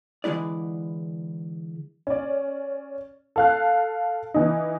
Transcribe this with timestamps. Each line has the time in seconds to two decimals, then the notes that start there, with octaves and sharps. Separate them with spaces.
0.24 D3 E3 G#3 E4 D5
2.07 C#4 D5
3.36 A4 F5 F#6
4.34 E3 D#4